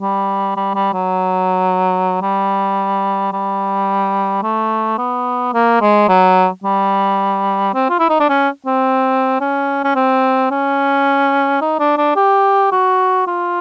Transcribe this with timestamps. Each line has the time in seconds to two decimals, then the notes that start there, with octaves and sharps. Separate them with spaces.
0.01 G3
0.57 G3
0.75 G3
0.93 F#3
2.22 G3
3.33 G3
4.43 A3
4.98 B3
5.54 A#3
5.82 G#3
6.09 F#3
6.64 G3
7.74 C4
7.90 F4
8.00 E4
8.09 D#4
8.20 D4
8.29 C#4
8.66 C4
9.40 C#4
9.84 C#4
9.96 C4
10.51 C#4
11.61 D#4
11.79 D4
11.98 D4
12.16 G4
12.72 F#4
13.27 F4